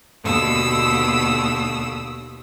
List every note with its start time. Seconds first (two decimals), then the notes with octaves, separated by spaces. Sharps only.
0.23 D#2 B2 D3 D#6 E6